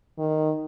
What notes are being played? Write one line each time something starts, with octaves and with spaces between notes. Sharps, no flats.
D#3